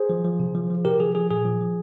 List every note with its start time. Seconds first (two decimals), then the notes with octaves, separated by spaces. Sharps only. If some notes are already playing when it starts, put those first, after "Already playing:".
Already playing: G#4 C5
0.10 F3
0.24 F3
0.40 C3
0.55 F3
0.70 F3
0.85 C3 G4 A#4
1.00 F3 G#4
1.15 F3 G#4
1.30 A#2 G#4
1.45 F3
1.61 F3